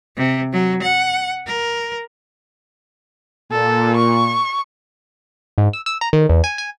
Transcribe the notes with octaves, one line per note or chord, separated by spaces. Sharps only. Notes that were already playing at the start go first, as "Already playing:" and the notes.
C3
F#3
F#5
A#4
A#2 A4
C#6
G#2
E6
E6
A#5
D#3
E2
G#5
G#5